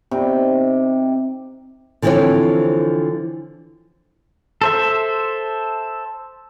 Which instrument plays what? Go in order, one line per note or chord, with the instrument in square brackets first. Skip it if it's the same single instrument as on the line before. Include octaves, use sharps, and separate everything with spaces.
[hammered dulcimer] C3 D#4
[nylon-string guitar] D3 E3 F3 C4 E4 C#5
[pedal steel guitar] A4 C5 E5